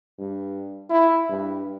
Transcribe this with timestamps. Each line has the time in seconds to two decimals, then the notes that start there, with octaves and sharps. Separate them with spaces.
0.18 G2
0.90 E4
1.29 G2